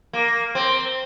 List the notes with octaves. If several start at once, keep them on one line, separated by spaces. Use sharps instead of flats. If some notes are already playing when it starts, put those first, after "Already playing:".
A#3
C4